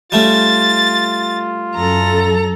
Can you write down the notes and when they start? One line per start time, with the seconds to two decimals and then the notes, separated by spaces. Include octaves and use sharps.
0.12 G3 A3 C#4 F4 A6
1.75 F#2 A4 A#5